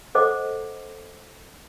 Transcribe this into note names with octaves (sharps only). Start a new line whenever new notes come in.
A4 C5 D#5 F#5 D6